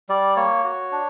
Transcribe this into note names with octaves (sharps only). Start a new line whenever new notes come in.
G3 D5
A#3 C#5
F#4
D4